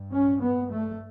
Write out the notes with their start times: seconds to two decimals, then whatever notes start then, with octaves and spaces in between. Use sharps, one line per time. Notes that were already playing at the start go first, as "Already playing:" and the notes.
Already playing: G2
0.12 C#4
0.41 B3
0.71 A3